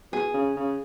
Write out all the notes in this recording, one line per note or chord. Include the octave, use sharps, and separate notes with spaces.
B2 G#4
C#3
C#3